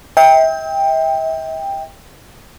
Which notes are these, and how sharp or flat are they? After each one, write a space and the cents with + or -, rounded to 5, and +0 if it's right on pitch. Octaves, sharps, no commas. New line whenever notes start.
E5 -40 G5 +15